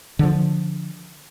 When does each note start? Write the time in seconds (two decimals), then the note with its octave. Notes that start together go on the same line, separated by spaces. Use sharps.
0.19 D3 F3